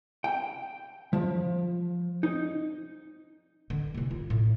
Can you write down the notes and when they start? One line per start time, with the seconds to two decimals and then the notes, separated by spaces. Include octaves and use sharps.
0.24 G5
1.13 F3
2.23 D#4
3.70 D3
3.94 C3 E3
4.11 F4
4.30 A2